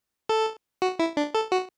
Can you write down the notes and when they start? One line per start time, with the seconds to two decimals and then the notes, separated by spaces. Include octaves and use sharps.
0.29 A4
0.82 F#4
0.99 E4
1.17 D4
1.35 A4
1.52 F#4